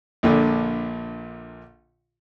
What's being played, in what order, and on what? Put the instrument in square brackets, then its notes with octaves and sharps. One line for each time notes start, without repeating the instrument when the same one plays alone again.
[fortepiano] A#1 A#2 D3